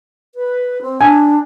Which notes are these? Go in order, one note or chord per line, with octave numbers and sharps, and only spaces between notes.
B4
C4
D4 G#5